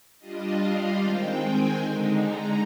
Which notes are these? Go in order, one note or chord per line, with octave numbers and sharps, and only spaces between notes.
G3 D4 F4 D#5
F5
D#3 G#3 C4 G5
G#5
D3 G#3 D#4
A#5